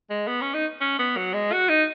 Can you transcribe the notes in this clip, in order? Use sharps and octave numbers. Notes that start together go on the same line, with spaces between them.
G#3
B3
C#4
D#4
C#4
B3
F#3
G#3
F#4
D#4